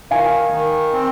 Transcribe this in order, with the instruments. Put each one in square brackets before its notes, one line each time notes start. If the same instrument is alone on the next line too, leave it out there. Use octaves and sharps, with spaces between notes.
[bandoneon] D#3 [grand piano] F5 G#5
[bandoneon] D#3
C4